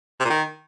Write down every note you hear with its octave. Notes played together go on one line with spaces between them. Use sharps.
C3
A#2
D#3